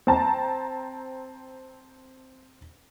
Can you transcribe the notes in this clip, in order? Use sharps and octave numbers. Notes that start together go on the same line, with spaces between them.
C4 A5 A#5